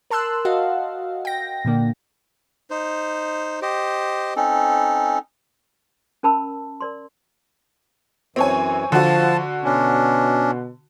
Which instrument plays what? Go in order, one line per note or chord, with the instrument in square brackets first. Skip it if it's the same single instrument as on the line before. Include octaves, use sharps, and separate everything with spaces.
[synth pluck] A#4 A5 C6 E6 F#6
F#4 D#5 F5 F#5
G5 A#6
A#2 D3 A#3 D4
[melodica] D#4 C5
G4 C5 D#5
C4 C#4 D#4 A4
[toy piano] C#4 A#4 A5 B5 E6
A#4 D5 C6
[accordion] F#2 E3 [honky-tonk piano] C4 C#5 G#5
[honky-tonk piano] D3 F#4 [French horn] F3 [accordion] A5
[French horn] B2 [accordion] C#4 D4